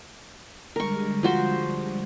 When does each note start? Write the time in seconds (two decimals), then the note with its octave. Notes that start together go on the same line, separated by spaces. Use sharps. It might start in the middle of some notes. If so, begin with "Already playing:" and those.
0.76 D3 G3 G#3 A#4 C#6
1.23 F3 F#4 C5